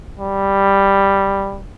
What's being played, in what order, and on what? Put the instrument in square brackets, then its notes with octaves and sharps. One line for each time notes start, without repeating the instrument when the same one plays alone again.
[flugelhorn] G3